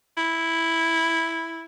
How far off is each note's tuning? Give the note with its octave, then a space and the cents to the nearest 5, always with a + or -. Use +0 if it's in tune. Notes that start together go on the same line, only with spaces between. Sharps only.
E4 -5